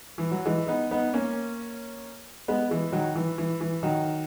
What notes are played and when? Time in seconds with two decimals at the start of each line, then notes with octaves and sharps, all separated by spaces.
0.18 E3
0.31 F#3
0.46 E3 G#3
0.68 B3 D#4
0.91 B3 D#4
1.13 A#3 C#4
2.48 G#3 B3
2.71 E3 G#3
2.92 D#3 F#3
3.15 E3
3.38 E3
3.61 E3
3.83 D#3 F#3